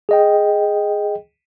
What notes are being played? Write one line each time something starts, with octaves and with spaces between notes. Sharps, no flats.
G#4 D#5 G5